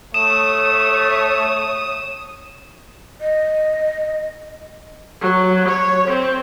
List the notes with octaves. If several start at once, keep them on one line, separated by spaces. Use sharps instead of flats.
A3 C#5 D#6 E7
D#5
F#3
C#5
C4